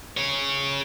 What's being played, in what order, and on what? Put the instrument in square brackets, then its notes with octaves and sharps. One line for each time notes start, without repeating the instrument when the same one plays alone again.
[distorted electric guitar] G#4 C#5